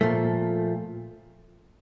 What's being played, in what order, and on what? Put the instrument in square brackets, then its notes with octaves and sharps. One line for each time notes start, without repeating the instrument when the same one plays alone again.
[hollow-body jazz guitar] A#2 F3 A3